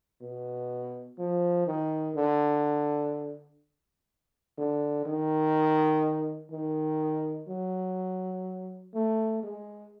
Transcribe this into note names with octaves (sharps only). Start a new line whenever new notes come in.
B2
F3
D#3
D3
D3
D#3
D#3
F#3
A3
G#3